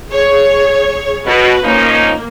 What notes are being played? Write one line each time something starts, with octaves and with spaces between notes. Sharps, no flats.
G#4 C#5
B2 F#4 B4
F3 A#3 C#4 D#4